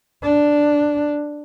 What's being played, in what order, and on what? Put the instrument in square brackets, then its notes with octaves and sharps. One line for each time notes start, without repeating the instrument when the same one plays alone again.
[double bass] D4